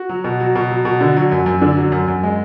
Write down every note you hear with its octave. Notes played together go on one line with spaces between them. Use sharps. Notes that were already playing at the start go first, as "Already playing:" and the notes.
Already playing: F#4
F#3
B2
F#3
B2
F#3
B2
D3
F#3
F#2
F#2
D3 D4
F#3
F#2
F#2
G#3